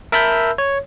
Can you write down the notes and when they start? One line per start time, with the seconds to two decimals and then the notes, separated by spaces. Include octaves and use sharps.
0.12 A#4 E5 A5 B5 E6 G6
0.58 C#5